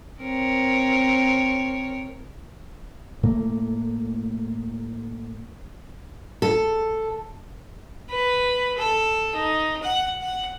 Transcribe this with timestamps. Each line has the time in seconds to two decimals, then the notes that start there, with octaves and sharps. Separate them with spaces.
0.21 C4 A#4 C#5
3.23 A2 A3 A#3
6.42 A4
8.10 B4
8.78 A4
9.35 D#4
9.83 F#5
10.21 F#5